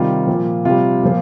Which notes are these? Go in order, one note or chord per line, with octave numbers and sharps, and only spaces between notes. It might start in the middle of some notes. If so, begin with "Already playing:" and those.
Already playing: C3 D#3 G3 F4
A#2 F3
C3 G3 F4
A#2 F3